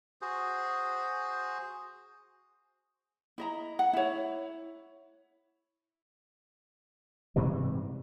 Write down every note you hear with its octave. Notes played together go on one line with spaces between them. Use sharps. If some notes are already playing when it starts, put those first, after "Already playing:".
F#4 G#4 C5
E4 D#5 A#5
F#5
E4 C#5
G#2 C3 E3 G3